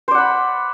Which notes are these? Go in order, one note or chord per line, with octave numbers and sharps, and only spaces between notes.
C5 D5 F#5 B5